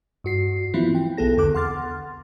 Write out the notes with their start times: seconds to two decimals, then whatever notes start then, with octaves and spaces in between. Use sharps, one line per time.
0.24 G2 F#4 C7
0.74 E3 F3 B3 C4 E4 F4
0.95 G5
1.17 B1 B3 G#4 A4 A#6
1.37 E2 D3 A4 D6 F#6
1.54 F#5 C6 F6 A6